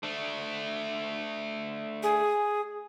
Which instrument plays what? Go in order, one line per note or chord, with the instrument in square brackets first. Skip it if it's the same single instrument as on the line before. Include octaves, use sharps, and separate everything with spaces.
[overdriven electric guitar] A3 D4
[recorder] G#4